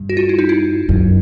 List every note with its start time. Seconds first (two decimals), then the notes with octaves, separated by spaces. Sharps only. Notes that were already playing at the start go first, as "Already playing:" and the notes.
Already playing: G2
0.09 F#4
0.17 F4
0.29 E4
0.39 D#4
0.49 E4
0.89 F#2